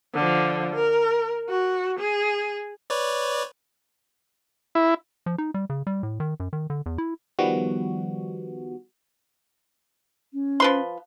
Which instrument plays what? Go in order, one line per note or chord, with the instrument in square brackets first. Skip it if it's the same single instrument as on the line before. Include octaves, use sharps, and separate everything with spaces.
[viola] D3 F3
A#4
F#4
G#4
[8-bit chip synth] B4 C#5 D5
[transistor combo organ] E4
[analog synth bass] F3
D#4
G3
C#3
G3
A2
D#3
F#2
D#3
D3
E2
E4
[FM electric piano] D#3 F3 G3 B3 F#4
[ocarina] C#4
[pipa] F3 B4 C6